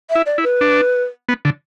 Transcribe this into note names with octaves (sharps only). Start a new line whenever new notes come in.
E5
E4
D5
E4
B4
D4
B3
D3